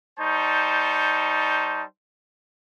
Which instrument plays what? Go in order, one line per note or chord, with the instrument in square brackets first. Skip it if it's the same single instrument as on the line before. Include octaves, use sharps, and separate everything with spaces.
[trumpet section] G3 D#4 C5 A5 C#6